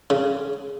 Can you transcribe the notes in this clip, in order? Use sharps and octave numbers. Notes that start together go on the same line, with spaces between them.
C#3